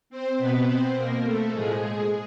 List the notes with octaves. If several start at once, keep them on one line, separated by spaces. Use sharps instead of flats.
C4 C5
B2 B3 B4
C4 C5
B2 A#3 A#4
A3 A4
A2 F3 G#3 G#4
G#3 G#4